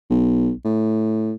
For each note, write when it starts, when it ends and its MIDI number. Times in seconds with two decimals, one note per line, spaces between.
0.10 0.51 35
0.65 1.33 45